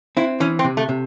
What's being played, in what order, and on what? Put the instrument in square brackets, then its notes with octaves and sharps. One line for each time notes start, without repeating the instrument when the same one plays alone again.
[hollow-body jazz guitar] C4 [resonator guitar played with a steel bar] E4
[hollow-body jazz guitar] E3 [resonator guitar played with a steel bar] C#4
[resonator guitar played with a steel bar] C4
[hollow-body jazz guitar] C3
[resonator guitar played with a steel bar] A3
[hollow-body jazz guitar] C3